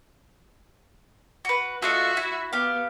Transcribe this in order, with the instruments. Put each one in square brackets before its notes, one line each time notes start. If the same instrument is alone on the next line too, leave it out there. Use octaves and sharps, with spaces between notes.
[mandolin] F#4 B4
[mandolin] A3 F4 D#5 [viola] F#4 E5
[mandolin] E4
[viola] B3 [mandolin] G4 F5